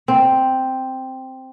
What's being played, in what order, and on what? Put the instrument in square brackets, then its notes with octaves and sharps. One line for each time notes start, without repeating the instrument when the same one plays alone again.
[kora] C4